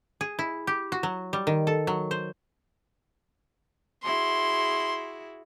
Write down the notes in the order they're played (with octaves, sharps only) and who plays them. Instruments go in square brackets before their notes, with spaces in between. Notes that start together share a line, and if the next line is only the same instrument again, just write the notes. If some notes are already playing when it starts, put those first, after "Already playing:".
[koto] G#4
E4
G4
F#4
F#3
G3
D#3
A4
F#3
C5
[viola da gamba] E4 F#4 G#4 [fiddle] C6